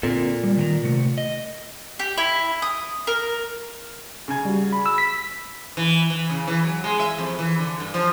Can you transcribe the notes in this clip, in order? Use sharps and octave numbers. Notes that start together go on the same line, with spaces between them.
A#2 D3 C4 A4
G3
D#3 G#5 A#5
C3 A3
D#5
G4
E4
D#6
A#4
C#3 G#5
G3 F#4
B5
E6
B6
E3
E3
C#3
E3
F#3
G#3
E5
F2
E3
D3
G2
F3